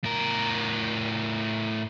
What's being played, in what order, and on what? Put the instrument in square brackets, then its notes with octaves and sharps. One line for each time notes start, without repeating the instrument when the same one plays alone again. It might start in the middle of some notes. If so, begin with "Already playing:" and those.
[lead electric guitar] A2 A#4